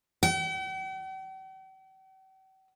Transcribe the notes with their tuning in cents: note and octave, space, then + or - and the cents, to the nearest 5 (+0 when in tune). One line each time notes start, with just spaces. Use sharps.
G5 -45